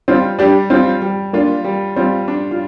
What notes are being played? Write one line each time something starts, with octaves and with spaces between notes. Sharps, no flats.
G3 C4 F4
G3 D4 G4
G3 C4 F4
G3
A#3 D4 F4
G3
G3 C4 F4
D4
F4